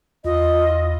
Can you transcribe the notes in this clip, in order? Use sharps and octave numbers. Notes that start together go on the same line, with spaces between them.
E2 F4 D#5